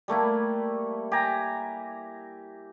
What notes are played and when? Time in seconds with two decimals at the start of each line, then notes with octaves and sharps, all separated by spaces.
0.08 G3 A3 A#3 E4
1.12 G4 G#5 A#5